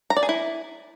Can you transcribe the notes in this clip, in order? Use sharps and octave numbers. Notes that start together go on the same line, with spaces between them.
A#5
D5
G#4
E4